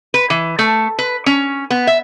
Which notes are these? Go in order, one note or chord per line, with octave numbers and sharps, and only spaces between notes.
B4
E3
A3
B4
C#4
B3
E5